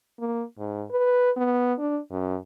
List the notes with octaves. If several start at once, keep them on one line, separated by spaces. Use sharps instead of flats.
A#3
G#2
B4
B3
D4
F#2